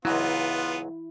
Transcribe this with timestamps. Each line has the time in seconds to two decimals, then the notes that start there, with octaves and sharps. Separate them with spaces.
0.05 C#2 G#2 F#3 B3 E4 F4